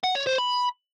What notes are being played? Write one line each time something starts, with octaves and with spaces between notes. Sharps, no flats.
F#5
C#5
C5
B5